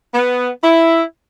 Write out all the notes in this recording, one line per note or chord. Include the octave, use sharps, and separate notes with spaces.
B3
E4